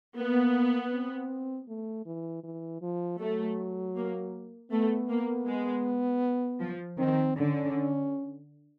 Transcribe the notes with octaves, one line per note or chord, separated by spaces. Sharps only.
A#3 B3
C4
A3
E3
E3
F3
F#3 A3
A#3
A3 B3
A#3
G#3
F3
D#3 C4
D3 C#4